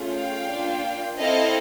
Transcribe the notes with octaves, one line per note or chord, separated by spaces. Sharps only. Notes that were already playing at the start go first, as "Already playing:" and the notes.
Already playing: A3 C#4 F4 G#4
F5 G5
A#3 D4 F4
C4 E4 A4 D#5 F5